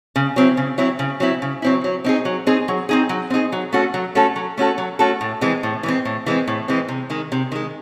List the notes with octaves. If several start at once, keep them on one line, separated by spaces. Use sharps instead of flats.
C#3
F#3 C4 E4
C#3
F#3 C4 E4
C#3
F#3 C4 E4
C#3
F#3 C4 E4
F#3
C4 D#4 G#4
F#3
C4 D#4 G#4
F#3
C4 D#4 G#4
F#3
C4 D#4 G#4
F#3
A3 C#4 F#4 A4
F#3
A3 C#4 F#4 A4
F#3
A3 C#4 F#4 A4
F#3
A3 C#4 F#4 A4
A2
E3 G#3 C4
A2
E3 G#3 C4
A2
E3 G#3 C4
A2
E3 G#3 C4
C3
D#3 G#3
C3
D#3 G#3